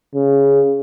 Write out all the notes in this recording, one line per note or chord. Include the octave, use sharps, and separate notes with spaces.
C#3